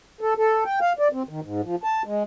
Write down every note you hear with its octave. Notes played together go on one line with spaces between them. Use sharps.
A4
A4
G5
F5
D5
C4
D#3
G#2
F3
A5
G#3